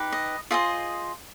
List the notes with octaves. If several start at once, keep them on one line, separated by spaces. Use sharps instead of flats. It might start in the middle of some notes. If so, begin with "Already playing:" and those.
Already playing: D#4 G4 B4
D#5
F4 G#4 C5 D#5 E5